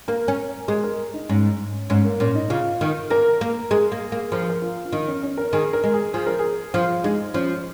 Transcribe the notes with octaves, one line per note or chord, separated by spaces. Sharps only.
A#3 A#4
C#4
G#3 G#4
A#4
D#4
G#2 C#4
G#2 C#4
A#3
A#2 C#4
D#4
C#3 F4
D#3
A#3 A#4
A#3
G#3 G#4
A#3
A#3
F3 A#4
G#4
A#4
F4
F4
D#3 D#4
C#4
C#4
A#4
D#3 G#4
A#4
G#3
G#4
F3 G#4
A#4
G#4
F3 F4
G#3 D#4
F3 C#4